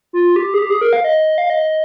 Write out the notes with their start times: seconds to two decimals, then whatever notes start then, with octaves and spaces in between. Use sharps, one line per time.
0.13 F4
0.36 G4
0.54 G#4
0.59 G4
0.70 G#4
0.81 A#4
0.93 F5
1.04 D#5
1.38 F5
1.50 D#5